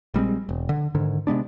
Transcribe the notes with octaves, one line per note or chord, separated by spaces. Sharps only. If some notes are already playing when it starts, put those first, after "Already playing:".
A#1 G3 G#3 C4
E1
D3
G#2 D3 D#3
C3 G#3 B3 D4